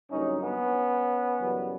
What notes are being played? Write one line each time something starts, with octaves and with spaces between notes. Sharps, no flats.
G2 D3 F#3 A#3 C#4 D#4
B3 C#4
F#2 C#3 E3 G3